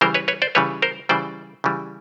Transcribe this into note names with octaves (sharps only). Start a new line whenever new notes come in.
C#3 E3 G3 A#4 C5
B4 C#5
B4 C#5
C5 D5
C#3 E3 G3 B4 C#5
A#4 C5
C#3 E3 G3 C5 D5
C#3 E3 G3